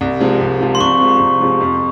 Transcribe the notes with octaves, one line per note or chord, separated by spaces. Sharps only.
C2
C3 F3 G#3
C2
C3 F3 G#3
C6
C2 C#6
C3 F3 G#3
C2
C3 F3 G#3
F2